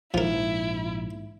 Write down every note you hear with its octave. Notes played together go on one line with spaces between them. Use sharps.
A#1 G#2 F3 E4 A#4